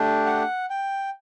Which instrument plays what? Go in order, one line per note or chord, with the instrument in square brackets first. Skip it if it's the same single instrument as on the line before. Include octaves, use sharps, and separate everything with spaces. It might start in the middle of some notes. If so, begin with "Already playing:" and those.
Already playing: [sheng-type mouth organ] A3 D4 G4
F#5
G5